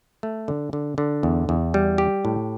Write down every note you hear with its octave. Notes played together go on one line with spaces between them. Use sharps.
A3
D3
D3
D3
E2
E2
G3
G4
A2